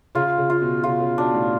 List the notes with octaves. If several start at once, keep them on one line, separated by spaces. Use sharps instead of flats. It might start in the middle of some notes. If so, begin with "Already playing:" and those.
C#3 F4
C#3
F4
B2
C#3 F4
C#3
B2 D4
A2